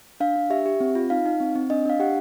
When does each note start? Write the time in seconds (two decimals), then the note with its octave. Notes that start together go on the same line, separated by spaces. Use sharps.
0.20 D4 F5
0.36 D4
0.50 G4 E5
0.66 G4
0.80 C4
0.95 F4
1.10 D#4 F5
1.26 D#4
1.40 C4
1.56 C4
1.70 D4 D#5
1.85 D4 F5
2.00 G4 F#5